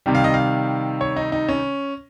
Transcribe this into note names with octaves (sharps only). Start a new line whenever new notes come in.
C3 D#3 G3
F5
D#5
F5
C#5
D#4
D#4
C#4